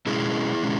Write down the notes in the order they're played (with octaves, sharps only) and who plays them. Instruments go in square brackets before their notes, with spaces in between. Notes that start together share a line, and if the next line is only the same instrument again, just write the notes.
[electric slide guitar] B2 G#3 C#4 E4 G#4
B2 G#3 C#4